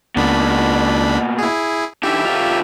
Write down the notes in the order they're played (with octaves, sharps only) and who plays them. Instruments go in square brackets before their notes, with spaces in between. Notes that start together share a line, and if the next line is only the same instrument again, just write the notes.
[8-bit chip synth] C#2 D4 B5 [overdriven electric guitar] B2 A#3
[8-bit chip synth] E4 G#4
[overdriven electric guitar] D3 E3 [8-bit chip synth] G4 E5
[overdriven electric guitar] D2 F4